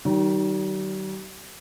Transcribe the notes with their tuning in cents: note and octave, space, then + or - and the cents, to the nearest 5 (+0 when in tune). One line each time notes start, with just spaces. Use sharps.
D#3 +0 G3 -45